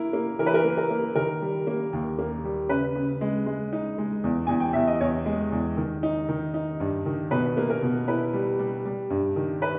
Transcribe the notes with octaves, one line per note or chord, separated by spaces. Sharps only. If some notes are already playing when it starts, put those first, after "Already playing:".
Already playing: A#3 E4 A#4
A#3
E3 A#4
B4
A#4
A#3
A#4
A#3
D#3 A#4
G3
A#3
D#2
A#3
G3
C#3 B4
C#3
G#3
G#3
D#4
G#3
E2
E2 G#5
G5
E2 E5
D#5
E2 C#5
G#3
E2
D#3
D#4
D#3
D#4
G2
D#3
B2 B4
A#3
A#4
B2
E4 B4
G3
G3
G3
G2
D#3
B4